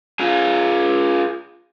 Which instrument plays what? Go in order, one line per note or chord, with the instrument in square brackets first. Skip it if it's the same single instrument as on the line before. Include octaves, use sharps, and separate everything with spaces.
[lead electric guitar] F4 G#4